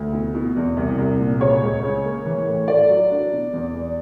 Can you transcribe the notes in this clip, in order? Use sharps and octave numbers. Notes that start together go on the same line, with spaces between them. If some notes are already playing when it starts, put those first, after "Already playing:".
Already playing: D2
B2
B2
E2
C2
C2
A#2
C#3 C#5
C#2
C#3
A#3
E3
A2
A3 D5
F#3
D4
B2
E2
E2